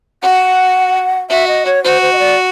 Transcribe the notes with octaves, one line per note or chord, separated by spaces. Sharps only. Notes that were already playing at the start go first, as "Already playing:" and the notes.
F#4 F#5
F#4 E5
D#5
C#5
F#4 C5
C5
D#5
D5